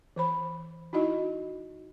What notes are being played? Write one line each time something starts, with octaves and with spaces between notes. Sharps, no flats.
E3 C5 B5
D#4 E4 F#4 D#5